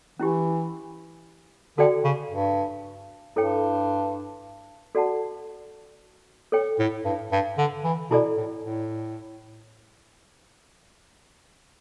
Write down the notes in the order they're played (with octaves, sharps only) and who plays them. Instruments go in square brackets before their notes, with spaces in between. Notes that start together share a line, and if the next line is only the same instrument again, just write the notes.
[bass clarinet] E3 [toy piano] C#4 E4 G4
[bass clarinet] D3 [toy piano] F#4 A4 D5 G5
[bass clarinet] C#3
G2
[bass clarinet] G2 [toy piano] E4 A4 C#5 G5
[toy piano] F#4 A4 D5 F#5 A5
A4 C#5 G5
[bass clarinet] A2
G2
G2
D3
E3
[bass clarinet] B2 [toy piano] E4 A4 D5
[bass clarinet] A2
A2